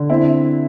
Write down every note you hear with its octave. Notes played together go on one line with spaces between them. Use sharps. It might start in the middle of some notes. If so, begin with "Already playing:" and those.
Already playing: D3
C4 E4